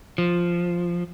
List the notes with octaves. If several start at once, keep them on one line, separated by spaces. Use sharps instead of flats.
F3